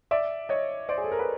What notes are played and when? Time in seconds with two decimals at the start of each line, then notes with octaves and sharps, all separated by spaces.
0.11 D5 E5
0.49 C#5 D#5
0.89 C5 D5
0.98 G#4
1.04 A4
1.12 A#4
1.19 B4